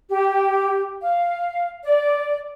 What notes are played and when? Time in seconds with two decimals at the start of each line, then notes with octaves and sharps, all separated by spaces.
0.10 G4
1.02 F5
1.83 D5